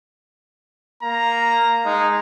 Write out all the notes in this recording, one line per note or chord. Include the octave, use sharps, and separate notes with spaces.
A#3 A#5
G#3 D#4